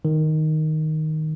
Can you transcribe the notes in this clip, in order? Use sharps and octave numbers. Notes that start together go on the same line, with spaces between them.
D#3